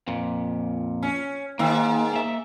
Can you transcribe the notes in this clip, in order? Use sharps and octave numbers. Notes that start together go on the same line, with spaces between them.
F2 A#2
C#4
G#2 D#3 A#3
A#3 E5